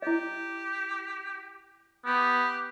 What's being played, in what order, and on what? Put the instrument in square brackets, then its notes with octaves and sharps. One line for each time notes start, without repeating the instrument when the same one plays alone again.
[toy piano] E4 D#5 [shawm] G4
[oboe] B3 [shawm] G4